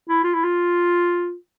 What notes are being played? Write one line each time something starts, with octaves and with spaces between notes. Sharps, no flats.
E4
F4
E4
F4